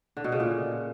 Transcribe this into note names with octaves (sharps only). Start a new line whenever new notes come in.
D3
B2
C#3
A#2